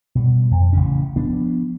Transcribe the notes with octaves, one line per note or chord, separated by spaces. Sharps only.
B2 G3
F2
A1 C#3 C#4
F3 B3 D4